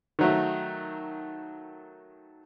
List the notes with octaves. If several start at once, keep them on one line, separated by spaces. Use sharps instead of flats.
D#3 F#3 A3